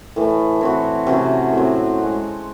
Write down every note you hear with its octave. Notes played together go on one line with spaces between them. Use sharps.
A2 E3 A3
E3 C4 F#4
C3 F#3 C#4 F#4
A2 F#3 C4
G#3 C4 F#4